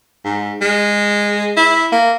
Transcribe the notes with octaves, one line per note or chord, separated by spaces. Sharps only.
G#2
G#3
E4
A#3